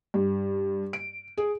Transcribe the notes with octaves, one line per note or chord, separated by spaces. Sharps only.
G2
D7
G#4